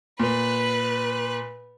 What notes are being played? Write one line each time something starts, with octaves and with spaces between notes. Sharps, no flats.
A#2 B4 F#6